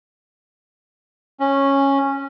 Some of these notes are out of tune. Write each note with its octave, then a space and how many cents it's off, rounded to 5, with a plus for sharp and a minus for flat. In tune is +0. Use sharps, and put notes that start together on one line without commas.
C#4 -10